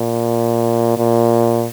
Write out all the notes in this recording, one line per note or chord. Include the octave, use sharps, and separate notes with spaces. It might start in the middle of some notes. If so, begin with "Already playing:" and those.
Already playing: A#2
A#2